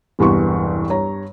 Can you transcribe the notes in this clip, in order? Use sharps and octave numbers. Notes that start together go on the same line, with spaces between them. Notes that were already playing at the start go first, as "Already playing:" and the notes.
E1 C2 G2 B3 C6 C#6
G2 C#5 A#5